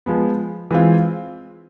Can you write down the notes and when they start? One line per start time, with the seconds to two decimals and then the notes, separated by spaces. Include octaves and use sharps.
0.06 F3 G#3 B3
0.71 E3 G#3 C4 F4